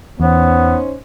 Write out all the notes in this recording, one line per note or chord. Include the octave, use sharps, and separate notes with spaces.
E2 B3 C#4 D#4 C5